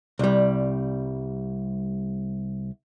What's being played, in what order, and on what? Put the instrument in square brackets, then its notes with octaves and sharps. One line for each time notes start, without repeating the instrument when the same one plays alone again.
[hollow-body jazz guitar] C2 G3